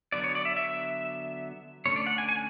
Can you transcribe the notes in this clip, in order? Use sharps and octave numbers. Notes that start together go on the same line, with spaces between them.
D3 F#3 B3 D5
C#5
D5
E5
E5
D3 A3 C#4 C#5
D5
F#5
G#5
G#5